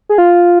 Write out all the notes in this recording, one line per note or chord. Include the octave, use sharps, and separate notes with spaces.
G#4
F4